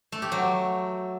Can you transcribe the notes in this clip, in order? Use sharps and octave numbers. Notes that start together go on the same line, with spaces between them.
A3
G4
F#3